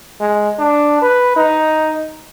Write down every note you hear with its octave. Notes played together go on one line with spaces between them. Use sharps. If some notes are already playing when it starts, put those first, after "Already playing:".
G#3
D4
B4
D#4